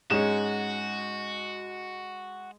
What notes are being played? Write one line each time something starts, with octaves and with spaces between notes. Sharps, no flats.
G#2 G#3 C#4 F#4 E7